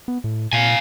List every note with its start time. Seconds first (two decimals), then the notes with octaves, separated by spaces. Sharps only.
0.08 B3
0.24 A2
0.53 A#2 F5 G#5